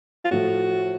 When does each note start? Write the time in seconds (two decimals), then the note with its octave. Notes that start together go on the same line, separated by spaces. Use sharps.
0.25 F4
0.31 A2 F3 A3 F#4